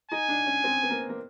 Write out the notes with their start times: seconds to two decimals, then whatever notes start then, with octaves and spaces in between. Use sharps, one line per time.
0.11 D#4 G#5
0.28 D4
0.46 C#4
0.64 C4
0.82 B3
0.90 A#3
1.09 A#3